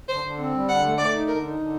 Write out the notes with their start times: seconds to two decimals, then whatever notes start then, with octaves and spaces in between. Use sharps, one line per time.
0.09 D3 C5
0.24 D3
0.38 C4
0.53 G3
0.68 D3 F#5
0.84 A3
0.98 A3 D5
1.13 D#4
1.28 D3 A#4
1.44 D#4
1.58 D3